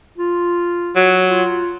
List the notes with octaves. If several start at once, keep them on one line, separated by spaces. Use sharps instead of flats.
F4
F#3
F4